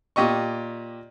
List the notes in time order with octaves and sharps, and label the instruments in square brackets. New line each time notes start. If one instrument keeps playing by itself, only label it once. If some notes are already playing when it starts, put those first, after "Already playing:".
[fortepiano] A#2 G4 D#5 C#6